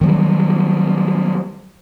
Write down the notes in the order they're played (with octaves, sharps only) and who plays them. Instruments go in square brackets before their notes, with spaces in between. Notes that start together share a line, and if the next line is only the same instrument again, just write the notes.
[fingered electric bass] D#3 F#3 G3